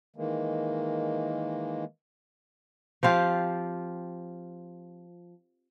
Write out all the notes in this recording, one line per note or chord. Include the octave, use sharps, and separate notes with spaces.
D#3 E3 G#3 A#3
F3 C4 F4 G4